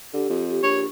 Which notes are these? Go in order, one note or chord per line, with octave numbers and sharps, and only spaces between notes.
D3 G4
F2
G4
A#1 C#5